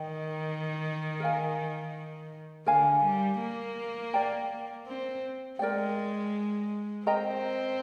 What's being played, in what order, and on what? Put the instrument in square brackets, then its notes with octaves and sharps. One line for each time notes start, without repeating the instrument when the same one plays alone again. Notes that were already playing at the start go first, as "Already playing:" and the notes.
Already playing: [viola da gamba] D#3 [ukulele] D#5 G5
[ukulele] A#4 F5 G#5
[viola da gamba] D3 [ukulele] A#4 F5 G#5
[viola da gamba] G3
A#3
[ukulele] A#4 D5 G5 A#5
[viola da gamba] C4
[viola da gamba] G#3 [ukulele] A#4 D5 G5
[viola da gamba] C4 [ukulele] A#4 D#5 G5 A#5